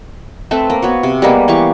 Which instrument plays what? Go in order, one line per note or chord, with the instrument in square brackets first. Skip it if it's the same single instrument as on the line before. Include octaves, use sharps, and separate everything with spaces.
[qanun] A3 C4 A4 B4
A#3
B3 F#4 C#5
C3
G3 G#3 A#3 B3
E3 G4 F5 C#6